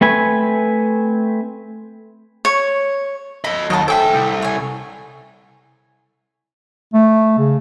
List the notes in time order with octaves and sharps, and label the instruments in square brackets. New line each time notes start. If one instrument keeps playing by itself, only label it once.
[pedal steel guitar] A3 C4 B4 G#5
[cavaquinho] C#5
[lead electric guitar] A4 D#5 [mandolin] B5
[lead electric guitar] D#2 [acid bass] F#3 [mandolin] D#5 A5
[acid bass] A4 [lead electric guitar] C5 G#5 [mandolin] E5 G5 D6
[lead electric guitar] C2
[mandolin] C#5 G#5
[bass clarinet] A3
C#3